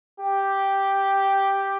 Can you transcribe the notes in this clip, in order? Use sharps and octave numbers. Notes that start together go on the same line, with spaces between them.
G4